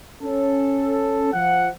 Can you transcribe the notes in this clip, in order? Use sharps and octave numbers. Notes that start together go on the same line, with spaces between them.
C#4 A4
F3 F#5